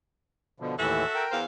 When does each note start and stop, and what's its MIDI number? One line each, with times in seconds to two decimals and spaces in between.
0.60 0.75 47
0.60 0.75 50
0.60 0.75 53
0.78 1.04 39
0.78 1.04 45
0.78 1.04 52
0.78 1.23 66
0.78 1.23 69
0.78 1.23 76
1.15 1.39 70
1.15 1.39 79
1.31 1.44 40
1.31 1.44 72
1.31 1.44 77